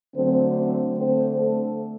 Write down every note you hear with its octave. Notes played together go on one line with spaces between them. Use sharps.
D3 F#3 A3 C4 C5
C4 C5
D3 A3 C4 C5
A3 A4